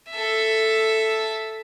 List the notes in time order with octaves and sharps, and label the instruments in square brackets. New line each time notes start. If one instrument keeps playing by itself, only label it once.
[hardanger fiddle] A4 E5